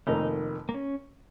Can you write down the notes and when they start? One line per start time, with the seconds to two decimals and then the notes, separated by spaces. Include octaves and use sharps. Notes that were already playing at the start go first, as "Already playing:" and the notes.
0.07 F1 F2 D#3 A#3 D#4
0.69 A#3
0.74 C#4